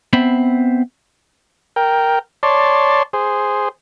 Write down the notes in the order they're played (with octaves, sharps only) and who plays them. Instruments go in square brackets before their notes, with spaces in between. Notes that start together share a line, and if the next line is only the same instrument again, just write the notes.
[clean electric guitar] B3 C4 C5 E5 B5
[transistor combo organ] A#4 G5
C#5 D5 A5 C6
G#4 C5